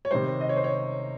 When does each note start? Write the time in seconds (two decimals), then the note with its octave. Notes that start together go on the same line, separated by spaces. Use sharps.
0.05 C#5
0.11 C3 D#3 G3 C5
0.41 D#5
0.49 C#5
0.56 C5
0.64 C#5